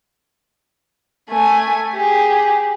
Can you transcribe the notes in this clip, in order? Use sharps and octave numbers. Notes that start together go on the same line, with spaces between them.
A3 G#5
G4 G#4